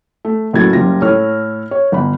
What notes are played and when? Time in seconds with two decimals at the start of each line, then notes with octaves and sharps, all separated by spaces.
0.25 A3
0.53 F#1 A2 A3 F#4 G#6 A6
0.73 F#1 G3 F4 A#6
1.02 A2 A4 C#5 F6
1.71 C#5
1.92 G1 B5